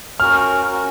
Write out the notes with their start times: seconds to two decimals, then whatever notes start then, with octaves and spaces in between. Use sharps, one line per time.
0.20 C#4 F#4 A#4 F6
0.71 C#4 F#4 A#4